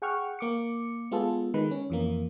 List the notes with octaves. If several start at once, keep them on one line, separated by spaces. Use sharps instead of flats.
G#4 F#5 G5 C#6 F6
A#3 D6 C#7
G#3 B3 F4 G#4 A4
D#3 G#3 B4
C#4
F2 E3 A#3